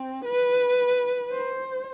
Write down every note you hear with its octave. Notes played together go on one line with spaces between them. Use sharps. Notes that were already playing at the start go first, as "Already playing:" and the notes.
Already playing: C4
B4
C5